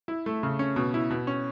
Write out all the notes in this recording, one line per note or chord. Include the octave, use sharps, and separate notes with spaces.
E4
A3
C#3
C#4
B2
E4
B2
C#4